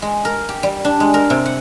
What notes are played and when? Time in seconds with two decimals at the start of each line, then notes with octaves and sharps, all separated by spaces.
0.02 G#3
0.25 A#4
0.49 G4
0.63 G3
0.85 D4
1.00 G#3
1.14 A#4
1.30 C3
1.46 F#5